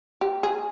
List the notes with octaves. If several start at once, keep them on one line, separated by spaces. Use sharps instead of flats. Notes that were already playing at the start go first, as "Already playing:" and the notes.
G4
G#4